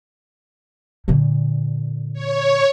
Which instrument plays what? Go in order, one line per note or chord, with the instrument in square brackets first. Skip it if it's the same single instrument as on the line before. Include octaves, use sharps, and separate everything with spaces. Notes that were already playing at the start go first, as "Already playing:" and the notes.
[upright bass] A#2 D3
[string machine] C#5